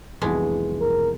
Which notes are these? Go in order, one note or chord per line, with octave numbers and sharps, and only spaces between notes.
F1 C2 B2 D3 E3 G#3
A#4